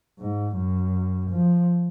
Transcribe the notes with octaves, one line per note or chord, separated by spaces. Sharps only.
G#2
F#2
F3